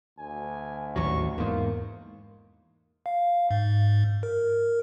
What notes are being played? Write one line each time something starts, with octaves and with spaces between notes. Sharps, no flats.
D2 G#5
A1 D#2 F#3 C#6
E2 G#2 A#3 F4
F5
G#2
A#4